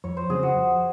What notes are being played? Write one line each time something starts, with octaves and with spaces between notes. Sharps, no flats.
F2 C#5
C5
C#3 F#3 C4 G#4
F#4
F2